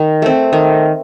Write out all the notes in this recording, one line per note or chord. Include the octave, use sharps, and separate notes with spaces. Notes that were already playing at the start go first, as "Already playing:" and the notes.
Already playing: D#3
A3 C4
D#3